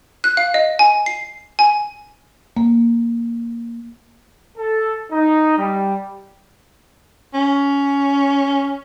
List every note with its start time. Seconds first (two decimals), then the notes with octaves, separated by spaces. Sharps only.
0.24 F#6
0.37 F5
0.54 D#5
0.79 G#5
1.06 C7
1.59 G#5
2.57 A#3
4.58 A4
5.11 D#4
5.58 G3
7.34 C#4